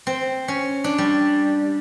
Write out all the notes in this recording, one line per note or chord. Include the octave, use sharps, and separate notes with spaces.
C4
C#4
D4
G3